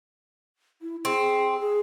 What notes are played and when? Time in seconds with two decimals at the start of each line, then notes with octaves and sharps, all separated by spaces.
0.82 E4
1.05 C4 G#4
1.60 G#4